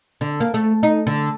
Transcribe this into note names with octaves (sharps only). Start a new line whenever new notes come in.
D3
A#3
A3
D#4
D3